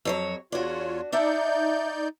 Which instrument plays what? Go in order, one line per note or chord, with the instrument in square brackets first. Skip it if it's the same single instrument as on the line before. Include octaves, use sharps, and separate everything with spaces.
[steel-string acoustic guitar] F2 F#3 C#5
[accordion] E2 F4 C#5 [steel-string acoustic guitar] D4 F#4
[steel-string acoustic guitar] D4 E5 F#5 [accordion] D#4 D5 G6